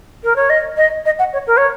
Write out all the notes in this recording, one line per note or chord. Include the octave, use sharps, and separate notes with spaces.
A#4
C#5
D#5
D#5
D#5
F#5
C#5
A#4
C#5